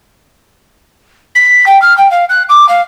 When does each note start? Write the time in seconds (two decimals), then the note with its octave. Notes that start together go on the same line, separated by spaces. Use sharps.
1.35 B6
1.66 G5
1.82 F6
1.97 G5
2.11 F5
2.29 F#6
2.49 D6
2.68 F5